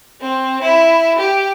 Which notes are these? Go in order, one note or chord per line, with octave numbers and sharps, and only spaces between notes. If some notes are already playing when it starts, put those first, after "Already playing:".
C4
E4
G4